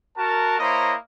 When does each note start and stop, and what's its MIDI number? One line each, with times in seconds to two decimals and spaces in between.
0.18 0.56 66
0.18 0.56 70
0.18 0.56 81
0.59 0.95 58
0.59 0.95 64
0.59 0.95 72
0.59 0.95 73
0.59 0.95 75
0.59 0.95 82